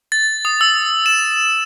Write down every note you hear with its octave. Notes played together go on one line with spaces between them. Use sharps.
A6
D#6
E6
E7